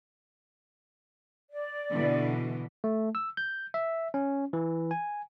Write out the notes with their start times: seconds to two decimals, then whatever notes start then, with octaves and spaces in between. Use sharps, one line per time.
1.50 D5
1.91 B2 D3 E3
2.84 A3
3.15 E6
3.37 G6
3.74 E5
4.14 C#4
4.53 E3
4.91 G#5